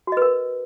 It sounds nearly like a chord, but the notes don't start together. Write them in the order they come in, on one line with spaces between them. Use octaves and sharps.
F#4 D#5 B4 A#4